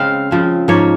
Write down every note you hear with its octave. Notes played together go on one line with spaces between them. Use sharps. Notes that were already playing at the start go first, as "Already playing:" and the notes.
Already playing: C#3 G#3 C4 F5
C#3 F3 C4
G#2 F3 A#3 C#5